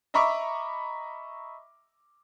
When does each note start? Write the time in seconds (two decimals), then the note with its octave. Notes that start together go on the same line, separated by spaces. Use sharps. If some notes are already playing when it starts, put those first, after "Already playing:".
0.14 D#5 E5 A#5 B5 C#6 D6